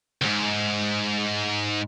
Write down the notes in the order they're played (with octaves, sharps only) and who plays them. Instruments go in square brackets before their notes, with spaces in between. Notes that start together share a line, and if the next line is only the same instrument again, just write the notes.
[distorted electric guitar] C#2 G#2